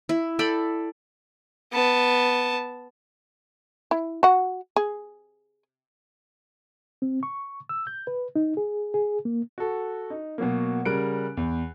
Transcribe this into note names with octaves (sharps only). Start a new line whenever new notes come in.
E4
A4 D5 G5 B5
B3 A5
E4
F#4 F#5
G#4
C4
C#6
E6
G6
B4
D#4
G#4
G#4
A#3
F#4 A4
D#4
B2 F#3 A#3
C#3 G3 A#4 F#5 F#6 D7
E2